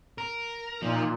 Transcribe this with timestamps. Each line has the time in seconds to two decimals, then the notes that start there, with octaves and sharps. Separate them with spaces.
0.18 A#4
0.82 A#2 F3 D#4